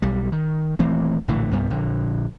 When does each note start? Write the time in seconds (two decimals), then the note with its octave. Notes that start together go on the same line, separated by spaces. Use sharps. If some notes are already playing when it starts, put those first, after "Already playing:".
0.02 B1 G3
0.32 D#3
0.79 D#1 E3 A3 C4
1.28 A#1 A2 D3 E3
1.51 C2 G2 G3 B3
1.70 A#1 D3